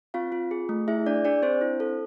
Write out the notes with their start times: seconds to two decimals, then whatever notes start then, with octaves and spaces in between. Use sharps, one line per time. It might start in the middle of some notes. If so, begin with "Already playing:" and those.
0.14 C4 F4 F5
0.32 F4
0.51 G#4
0.69 A3
0.88 E4 G#4 E5
1.06 D4 D5
1.25 D4 G#4 D5
1.43 C4 D4 C5
1.61 E4
1.80 A4